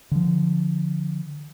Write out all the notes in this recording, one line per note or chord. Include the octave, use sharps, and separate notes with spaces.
D3 F3